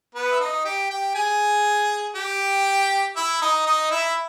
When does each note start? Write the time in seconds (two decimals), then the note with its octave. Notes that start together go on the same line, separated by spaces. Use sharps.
0.15 B3 B4
0.31 E5
0.40 D#4 D#5
0.65 G4 G5
0.90 G4 G5
1.15 G#4 G#5
2.15 G4 G5
3.16 E4 E5
3.41 D#4 D#5
3.66 D#4 D#5
3.91 E4 E5